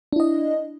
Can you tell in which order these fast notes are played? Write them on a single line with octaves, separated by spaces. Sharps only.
D4 E4 D#5